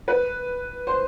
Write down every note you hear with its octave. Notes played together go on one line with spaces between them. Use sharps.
B4
C5